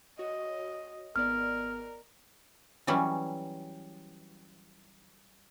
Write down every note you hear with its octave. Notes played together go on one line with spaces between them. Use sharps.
F#4 C#5 D#5
G#1 B3 A#4 D5 F6
E3 F#3 G3 C#4